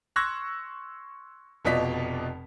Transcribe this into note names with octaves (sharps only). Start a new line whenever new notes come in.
C6 C#6 E6 F#6 G#6 A#6
F1 B2 F3 D5 D#5 B6